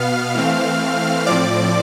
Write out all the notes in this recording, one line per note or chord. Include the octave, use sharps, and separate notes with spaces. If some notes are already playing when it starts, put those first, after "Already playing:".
Already playing: B2 B3 F5 F6
E3 A3 C4
A2 F3 C4 D5 D6